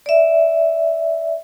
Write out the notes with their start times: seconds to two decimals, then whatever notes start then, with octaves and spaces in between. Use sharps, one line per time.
0.06 D5 E5